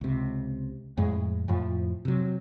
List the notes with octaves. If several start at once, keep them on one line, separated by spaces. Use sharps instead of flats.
C#2 C3
F2 A2 G#3
F2 A2 F3
C3 F#3